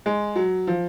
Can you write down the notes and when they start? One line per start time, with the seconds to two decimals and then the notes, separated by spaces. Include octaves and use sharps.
0.06 G#3
0.36 F#3
0.67 F3